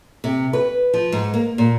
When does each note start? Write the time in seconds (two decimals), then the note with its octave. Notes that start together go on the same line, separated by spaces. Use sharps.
0.24 C3
0.53 B4
0.94 F3
1.12 G#2
1.34 A#3
1.58 A#2